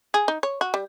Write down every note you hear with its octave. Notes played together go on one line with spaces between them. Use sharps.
G#4
D#4
C#5
F#4
G3